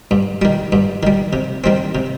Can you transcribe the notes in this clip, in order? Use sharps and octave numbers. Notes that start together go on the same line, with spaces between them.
G2
D#3 G3
G2
D#3 G3
C3
D#3 G3 C4
C3